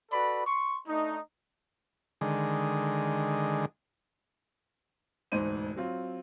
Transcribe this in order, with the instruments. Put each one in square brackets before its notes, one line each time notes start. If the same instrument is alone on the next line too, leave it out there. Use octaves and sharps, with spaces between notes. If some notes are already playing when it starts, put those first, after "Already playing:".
[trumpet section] F#4 A4 B4 D5 B5
C6 C#6
A3 D4 D#4
[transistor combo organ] D3 D#3 G#3
[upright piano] E1 D2 G#2 D#4 C5 D#7
F#3 C4 F4